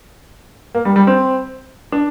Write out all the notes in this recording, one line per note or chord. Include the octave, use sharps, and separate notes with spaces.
A#3
G3
G3
C4
D4